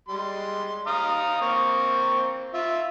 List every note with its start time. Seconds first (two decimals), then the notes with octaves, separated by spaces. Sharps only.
0.09 G3 G#3 C6
0.87 F5 A#5 D#6
1.41 A#3 C4 C#6
2.54 F4 E5